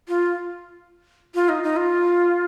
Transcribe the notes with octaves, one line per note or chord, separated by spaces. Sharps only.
F4
F4
D#4
D#4
F4